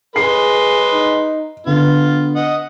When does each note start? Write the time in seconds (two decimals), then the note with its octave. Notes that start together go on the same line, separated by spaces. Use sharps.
0.16 G#3 G#4 B4 C6 C7
0.93 D#4
1.67 D3 B3 F4
2.36 D#5 F#5